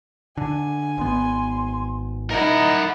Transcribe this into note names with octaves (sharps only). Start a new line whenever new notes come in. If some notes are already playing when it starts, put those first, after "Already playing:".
D3 G#5
G#1 B3 C6
D#4 E4 A#4 F#5